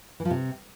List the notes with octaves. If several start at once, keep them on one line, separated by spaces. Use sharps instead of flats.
E3
F3
C3